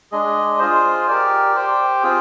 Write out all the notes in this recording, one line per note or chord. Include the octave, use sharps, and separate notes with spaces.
G#3 D4 G#4 D#5
F4 G#4 C5
G4 A#4 D5
G4 C5 G5
C4 F4 G#4